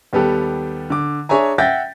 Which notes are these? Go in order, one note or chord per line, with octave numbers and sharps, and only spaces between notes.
D#2 G3 B3 G4 A4
D3 D6
D4 G#4 C#5 E5 G#5 A#5
E5 F#5 G5 G6 A6 A#6